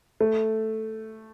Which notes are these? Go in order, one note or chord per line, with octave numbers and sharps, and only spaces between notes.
A3